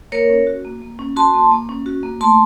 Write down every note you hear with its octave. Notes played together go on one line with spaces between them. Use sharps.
A#3 A#4 C#5
C#4
F#4
A#3
A#3
C#4
F#4 A5 C6
A#3
A#3
C#4
F#4
A#3
A3 A5 C6